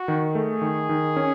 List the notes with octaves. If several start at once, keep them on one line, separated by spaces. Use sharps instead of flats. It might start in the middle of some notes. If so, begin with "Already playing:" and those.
Already playing: F#4
D#3
A3 G#4
D#3
D#3
C#4